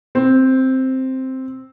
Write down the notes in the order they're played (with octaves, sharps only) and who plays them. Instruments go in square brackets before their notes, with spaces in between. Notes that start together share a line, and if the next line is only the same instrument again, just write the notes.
[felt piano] C4